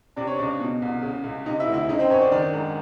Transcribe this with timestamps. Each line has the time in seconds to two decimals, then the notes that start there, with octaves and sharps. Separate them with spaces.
0.16 C3 D4 D5
0.27 C#4 C#5
0.38 C#2 D4 D5
0.60 B2
0.82 C2
1.02 C#3
1.24 C#2
1.45 C3 D#4 D#5
1.60 E4 E5
1.67 D2
1.74 E4 E5
1.88 C#3 D#4 D#5
1.99 C4 C5
2.10 F#2 C#4 C#5
2.21 D4 D5
2.32 D#3 D4 D5
2.53 G#2